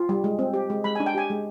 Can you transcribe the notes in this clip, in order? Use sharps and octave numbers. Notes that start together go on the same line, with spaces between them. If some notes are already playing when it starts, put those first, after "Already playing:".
Already playing: F4
G3
G#3
C4
G4
G#3
G#3 B5
D4 G#5
G5
G4 G#5
G#3